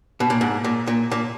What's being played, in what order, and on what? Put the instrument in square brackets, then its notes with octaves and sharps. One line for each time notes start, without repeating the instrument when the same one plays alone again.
[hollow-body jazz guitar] B2
A#2
G#2
A#2
A#2
A#2